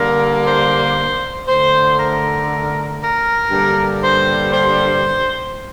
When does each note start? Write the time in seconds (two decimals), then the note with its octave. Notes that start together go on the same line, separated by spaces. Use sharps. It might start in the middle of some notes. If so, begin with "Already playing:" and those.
Already playing: D3 G3 A#3 A#4
0.45 C5
1.47 D3 A3 C5
1.98 A#4
2.99 A#4
3.50 G2 D3 G3 A#3
4.01 C5
4.51 C5